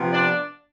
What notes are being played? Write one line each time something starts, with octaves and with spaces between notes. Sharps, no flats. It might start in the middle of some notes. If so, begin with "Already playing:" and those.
Already playing: C3 F3 B3 F4
D4 D5